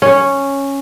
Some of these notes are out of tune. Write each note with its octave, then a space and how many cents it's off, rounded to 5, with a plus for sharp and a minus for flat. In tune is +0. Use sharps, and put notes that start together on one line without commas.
C#4 -5